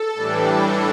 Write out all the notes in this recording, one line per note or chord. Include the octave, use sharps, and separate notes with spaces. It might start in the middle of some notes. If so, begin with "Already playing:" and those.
Already playing: A4
A2 E3 G3 D4